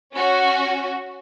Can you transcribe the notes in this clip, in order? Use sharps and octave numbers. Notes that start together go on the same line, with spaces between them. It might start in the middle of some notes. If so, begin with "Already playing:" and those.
C#4 F#4